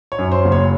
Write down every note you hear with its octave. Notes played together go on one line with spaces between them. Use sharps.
C#5
F#2
C5
F#1
C#5